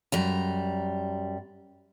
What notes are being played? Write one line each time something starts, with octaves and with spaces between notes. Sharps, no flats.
F#2 G3 A#5